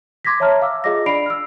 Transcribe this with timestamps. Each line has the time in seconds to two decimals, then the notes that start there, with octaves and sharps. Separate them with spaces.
0.25 C6 D6 G#6 A#6 B6
0.40 C#5 E5 A5 A#5 F6
0.62 F5 D6 E6
0.84 F4 G#4 D#5 F5 D6 A#6
1.06 D4 D5 B5 C7 D7 F7
1.26 E6 F6